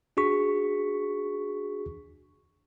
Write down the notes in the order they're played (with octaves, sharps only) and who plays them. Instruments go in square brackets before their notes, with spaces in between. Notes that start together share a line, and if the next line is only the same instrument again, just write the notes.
[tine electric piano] D4 F#4 G#4 C#6 B6